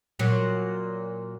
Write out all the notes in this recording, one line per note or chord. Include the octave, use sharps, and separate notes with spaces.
A#2 F#3